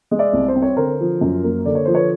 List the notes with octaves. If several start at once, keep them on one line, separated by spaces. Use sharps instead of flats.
G#3
D5 E5
C2
C5
C4
C#5
D3 A#4 C5
F3
F#2
A#3
D3 D5
C#5
F3 C5
B4 C#5